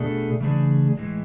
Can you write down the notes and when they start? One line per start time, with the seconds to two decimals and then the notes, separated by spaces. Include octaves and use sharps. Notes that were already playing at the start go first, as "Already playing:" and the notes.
Already playing: B2 A3 D4 G#4
0.40 C#3 E3 A3 D4 G#4
0.97 A2 E3 G#3